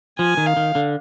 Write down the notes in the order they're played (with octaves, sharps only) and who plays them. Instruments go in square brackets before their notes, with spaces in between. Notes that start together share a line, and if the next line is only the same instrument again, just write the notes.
[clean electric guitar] F3 [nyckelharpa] G#5
[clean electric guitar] D#3
[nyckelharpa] F5
[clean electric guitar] D#3
D3